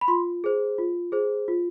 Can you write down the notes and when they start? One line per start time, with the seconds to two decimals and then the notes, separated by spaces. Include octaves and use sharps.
0.01 B5
0.08 F4 C6
0.44 G#4 C5
0.78 F4
1.12 G#4 C5
1.48 F4